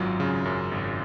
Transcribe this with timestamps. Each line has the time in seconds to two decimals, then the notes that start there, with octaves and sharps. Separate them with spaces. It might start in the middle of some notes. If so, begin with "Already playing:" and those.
Already playing: G#1 F#2 F#3 F4
0.20 C#3
0.45 F#2
0.72 G#1